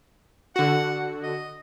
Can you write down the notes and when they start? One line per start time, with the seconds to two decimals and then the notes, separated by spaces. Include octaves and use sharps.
0.56 D3 F#4 F#5
1.23 D#5